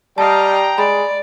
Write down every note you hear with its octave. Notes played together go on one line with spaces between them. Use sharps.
G3 D#5 F5 G5 A5 A#5
G#3 D5 B5